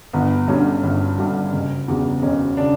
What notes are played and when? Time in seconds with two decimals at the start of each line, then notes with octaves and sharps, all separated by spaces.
0.13 G1 B3
0.48 G2 D3 G3 C#4
0.83 G1
1.18 G2 D3 G3
1.53 F#1
1.88 E2 C#3 G3
2.22 F#1 C#4
2.57 C#3 D4